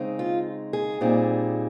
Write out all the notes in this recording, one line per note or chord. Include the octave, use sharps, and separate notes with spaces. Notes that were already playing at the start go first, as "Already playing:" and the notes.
Already playing: C#3 G#3 C4 D#4
F4
G#4
A#2 G3 C4 D#4